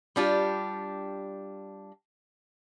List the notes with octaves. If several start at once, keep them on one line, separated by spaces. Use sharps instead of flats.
G3 D4 F4 G4